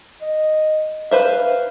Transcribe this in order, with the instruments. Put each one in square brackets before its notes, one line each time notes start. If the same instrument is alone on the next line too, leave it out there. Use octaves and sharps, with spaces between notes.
[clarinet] D#5
[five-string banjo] B4 C5 E5 [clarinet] F5